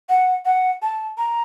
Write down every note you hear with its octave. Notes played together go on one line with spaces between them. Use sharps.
F#5
F#5
A5
A#5